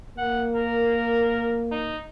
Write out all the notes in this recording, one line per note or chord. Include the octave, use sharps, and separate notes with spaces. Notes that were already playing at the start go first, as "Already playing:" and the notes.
A#3 F#5
A#4
D#4